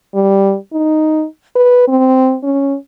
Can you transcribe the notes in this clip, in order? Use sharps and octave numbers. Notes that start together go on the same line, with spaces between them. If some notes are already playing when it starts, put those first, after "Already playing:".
G3
D#4
B4
C4
C#4